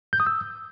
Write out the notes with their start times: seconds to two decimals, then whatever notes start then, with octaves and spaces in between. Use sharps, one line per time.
0.13 G6
0.20 D#6
0.27 E6